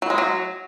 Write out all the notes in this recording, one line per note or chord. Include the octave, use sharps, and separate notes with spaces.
F#3
G#3
F#3